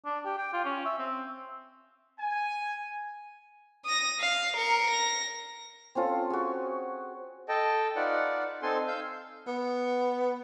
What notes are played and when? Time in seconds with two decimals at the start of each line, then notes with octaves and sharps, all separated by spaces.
0.05 D4
0.25 G4
0.38 G5
0.53 F4
0.65 C#4
0.85 E5
0.99 C4
2.19 G#5
3.85 D#6 A#6
4.20 F5
4.57 A#4 C#7
4.91 A#6
5.95 C4 C#4 F4 A4
6.30 F#4 G#4
7.49 A4 D#5 G5 A5
7.96 D#4 F4 B4 D5 F#5
8.62 C4 D#4 A4 G#5 C6
8.88 F5 E6 G6
9.48 B3